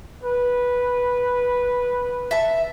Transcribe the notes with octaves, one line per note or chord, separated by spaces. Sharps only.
B4
E5 A5